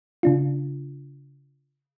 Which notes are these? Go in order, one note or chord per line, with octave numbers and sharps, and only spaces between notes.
C#3 D4 F4